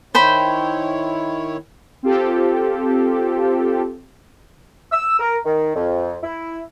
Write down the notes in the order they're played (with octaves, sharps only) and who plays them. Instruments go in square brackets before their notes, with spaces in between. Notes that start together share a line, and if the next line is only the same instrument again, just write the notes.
[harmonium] D#3 E4 C#5 [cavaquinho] C5 G5 B5
[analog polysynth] C4 F4 G4 A4
[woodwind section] E6
A#4
D#3
F2
E4